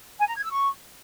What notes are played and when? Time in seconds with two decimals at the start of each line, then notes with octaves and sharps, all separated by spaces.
0.20 G#5
0.28 A#5
0.36 G#6
0.44 E6
0.52 C#6